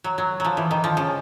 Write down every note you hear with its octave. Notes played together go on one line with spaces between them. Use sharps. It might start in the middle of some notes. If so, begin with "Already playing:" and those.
F#3
F#3
F3 F#3
E3
D#3
F3
C#3